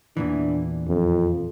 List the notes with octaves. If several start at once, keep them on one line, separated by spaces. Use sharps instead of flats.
E2 A#2 E3 D4
F2